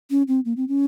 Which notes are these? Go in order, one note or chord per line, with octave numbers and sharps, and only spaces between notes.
C#4
C4
A#3
C4
C#4